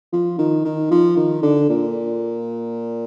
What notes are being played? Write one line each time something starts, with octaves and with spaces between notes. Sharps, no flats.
F3
D#3
D#3
F3
D#3
D3
A#2